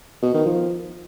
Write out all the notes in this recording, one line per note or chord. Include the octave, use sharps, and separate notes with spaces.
B2
D#3
F3